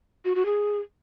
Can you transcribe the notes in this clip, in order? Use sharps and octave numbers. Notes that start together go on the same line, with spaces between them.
F#4
F#4
G#4